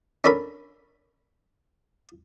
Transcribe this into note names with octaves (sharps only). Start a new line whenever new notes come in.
C#4 D4 A4 A#4 B5